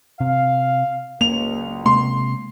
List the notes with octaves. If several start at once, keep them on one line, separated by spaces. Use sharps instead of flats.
C3 F5
F#1 C#2 A#3 F7
C3 G#3 A#3 C6